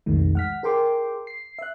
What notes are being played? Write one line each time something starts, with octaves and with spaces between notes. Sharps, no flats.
B1 F2 A2 D#3 G#3
F#5 F6 B6
G#4 A#4 G5 C6 D6
C7
E5 F#6